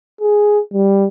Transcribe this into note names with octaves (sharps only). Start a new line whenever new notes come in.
G#4
G3